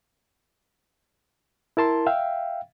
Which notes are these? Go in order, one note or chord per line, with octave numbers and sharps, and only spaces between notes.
E4 A#4 A5 C6
E5 F5 G5